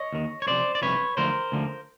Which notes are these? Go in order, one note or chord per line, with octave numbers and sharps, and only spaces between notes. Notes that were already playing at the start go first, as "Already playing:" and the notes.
Already playing: C#5 D#5
D#2 D#3
C#5
C2 C3 F3 C5 D5
D5
C2 C3 F3 B4 C#5
D2 D3 F3 A#4 C5
D2 D3 F3